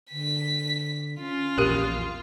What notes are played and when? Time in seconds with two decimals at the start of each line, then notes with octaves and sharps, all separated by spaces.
0.11 D3 B6
1.19 C#4 F4
1.58 A#1 E2 G4 A#4